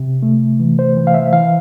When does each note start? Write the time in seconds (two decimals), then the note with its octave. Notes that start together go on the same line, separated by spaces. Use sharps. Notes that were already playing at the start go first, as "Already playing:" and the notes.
Already playing: C3
0.23 A3
0.60 E3
0.79 C5
0.97 E3
1.07 F5
1.14 E5
1.33 E3 F5